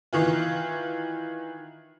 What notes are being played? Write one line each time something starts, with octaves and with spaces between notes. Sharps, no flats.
D#3 E3 F4